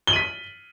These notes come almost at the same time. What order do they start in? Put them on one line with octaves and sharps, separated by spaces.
G7 F#7 D#7 B6